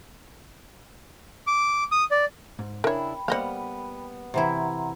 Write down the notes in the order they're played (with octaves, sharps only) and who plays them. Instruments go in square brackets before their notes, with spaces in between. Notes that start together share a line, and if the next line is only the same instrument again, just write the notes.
[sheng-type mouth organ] D6
D#6
D5
[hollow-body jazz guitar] G#2
[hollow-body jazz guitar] C#3 D4 E4 [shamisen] A#4 C#5 [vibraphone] G5 B5
[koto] G3 F#5 [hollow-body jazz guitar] A#3 B3 [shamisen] C5 D#5 F5
[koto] C3 E3 E4 [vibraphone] F#5 A#5 C6